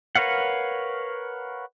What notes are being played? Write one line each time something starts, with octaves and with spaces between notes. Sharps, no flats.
A#4 B4 C#5 F5 F#5